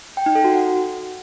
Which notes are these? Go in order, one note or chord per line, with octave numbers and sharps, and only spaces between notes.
G5
D#4
A4
F#4
F#5